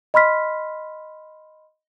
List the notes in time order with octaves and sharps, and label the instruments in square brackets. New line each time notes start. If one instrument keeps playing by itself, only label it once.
[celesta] D#5 B5 C6 F6 B6